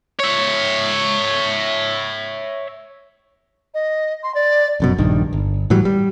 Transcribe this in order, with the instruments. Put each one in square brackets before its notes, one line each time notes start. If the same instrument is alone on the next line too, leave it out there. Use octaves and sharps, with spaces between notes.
[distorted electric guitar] C#5 E5
[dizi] D#5
C6
D5
[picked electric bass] F1 F#2 B2
A#1 G2 D#3
G1
A2 E3 F#3 G3
G3